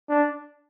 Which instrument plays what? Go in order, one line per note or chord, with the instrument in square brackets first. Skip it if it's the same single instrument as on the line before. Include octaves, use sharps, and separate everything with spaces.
[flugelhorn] D4